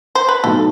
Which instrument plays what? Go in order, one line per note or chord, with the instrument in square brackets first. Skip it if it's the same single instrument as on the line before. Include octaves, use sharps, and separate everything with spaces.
[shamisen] C5
B4
[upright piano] B1 A2 F#3 [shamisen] A4